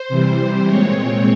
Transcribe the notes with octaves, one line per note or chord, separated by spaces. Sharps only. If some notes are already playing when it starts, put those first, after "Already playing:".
Already playing: C5
C3 E3 G3
A#2 G#3 C4 C#5